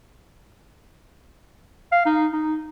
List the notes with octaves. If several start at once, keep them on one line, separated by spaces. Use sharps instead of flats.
F5
D#4
D#4